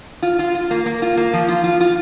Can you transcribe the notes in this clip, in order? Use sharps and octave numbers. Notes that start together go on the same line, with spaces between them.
F4
F4
F4
A#3
A#3
F4
A#3
F3
F4
F4
F4